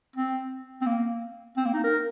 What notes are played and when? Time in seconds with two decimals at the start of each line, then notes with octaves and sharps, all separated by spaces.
0.16 C4
0.81 C4
0.86 A#3
1.57 C4
1.65 A#3
1.74 D#4
1.84 A#4